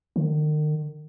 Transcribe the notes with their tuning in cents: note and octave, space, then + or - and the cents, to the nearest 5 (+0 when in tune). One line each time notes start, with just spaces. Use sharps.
D#3 -40